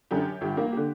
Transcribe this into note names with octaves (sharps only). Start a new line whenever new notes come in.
F#2 D3 G4
G1 G4
A#3
D3 G4